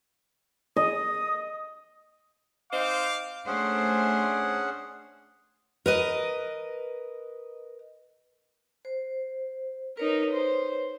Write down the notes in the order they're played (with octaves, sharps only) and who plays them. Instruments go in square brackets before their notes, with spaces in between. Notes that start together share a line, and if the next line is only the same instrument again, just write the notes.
[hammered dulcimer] D#5 [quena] D#6
[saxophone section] C4 D#4 C5 [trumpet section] F5 D6
[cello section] A3 D4 C5 [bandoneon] C#4 G#4 F#5
[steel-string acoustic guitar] A#4 B4 D#5
[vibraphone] C5
[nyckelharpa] D#4 A#4 [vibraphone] B4 C#5
[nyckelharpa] C5